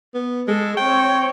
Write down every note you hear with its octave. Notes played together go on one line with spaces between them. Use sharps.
B3
G#3 A4
C4 C#5 G5